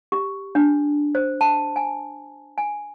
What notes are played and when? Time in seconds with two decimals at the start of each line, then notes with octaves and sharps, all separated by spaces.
0.12 G4
0.55 D4
1.15 C5
1.41 A5
1.76 G#5
2.58 G#5